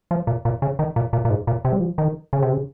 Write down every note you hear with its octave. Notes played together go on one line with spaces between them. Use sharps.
F3
A#2
A#2
C#3
D#3
A#2
A#2
A#2
G#2
A#2
C3
G3
F3
D#3
C#3
C3
C#3